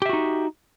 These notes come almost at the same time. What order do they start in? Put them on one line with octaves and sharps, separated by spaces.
G4 E5 F#4 D#4